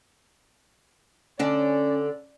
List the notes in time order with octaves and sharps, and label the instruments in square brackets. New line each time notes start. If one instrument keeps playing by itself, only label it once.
[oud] D3 D4 [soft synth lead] C#4 [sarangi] D5